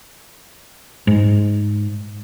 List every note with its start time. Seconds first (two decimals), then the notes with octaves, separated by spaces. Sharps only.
1.07 G#2